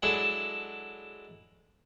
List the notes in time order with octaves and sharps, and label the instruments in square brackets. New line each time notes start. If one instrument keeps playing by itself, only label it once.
[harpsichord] F#3 G#3 D4 E4 A4